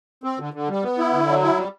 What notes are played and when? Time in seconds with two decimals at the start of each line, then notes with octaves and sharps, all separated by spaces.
0.24 C4
0.39 D3
0.54 D3
0.69 G3
0.83 B3
0.98 E4
1.13 D3
1.27 F#3
1.42 E4
1.57 G3